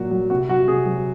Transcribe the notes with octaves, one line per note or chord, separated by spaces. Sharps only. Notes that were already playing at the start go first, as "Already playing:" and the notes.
Already playing: A#2 F#3 F#4
F#3
C3 F#4
F#3 F#4
C3 G#4
F#3